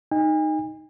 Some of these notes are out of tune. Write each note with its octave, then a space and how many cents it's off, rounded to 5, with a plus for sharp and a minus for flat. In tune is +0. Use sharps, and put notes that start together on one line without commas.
D#4 -5 G#5 -40